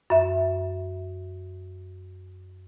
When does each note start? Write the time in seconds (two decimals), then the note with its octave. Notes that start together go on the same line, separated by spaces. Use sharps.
0.10 F#2 E5